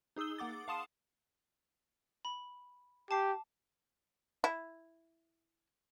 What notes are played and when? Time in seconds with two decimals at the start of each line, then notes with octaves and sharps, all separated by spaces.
0.16 D#4 G#4 D#6 E6 G7
0.39 A#3 F#5 D6 A6
0.68 F5 F#5 A5 C6 D#6 E7
2.25 B5
3.11 G4 A5 D6 C7
4.44 E4